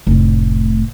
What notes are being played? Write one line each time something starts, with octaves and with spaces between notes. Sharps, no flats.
F1 A2